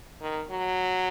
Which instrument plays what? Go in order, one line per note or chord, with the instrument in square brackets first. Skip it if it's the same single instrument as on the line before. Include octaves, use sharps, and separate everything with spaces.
[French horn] D#3
F#3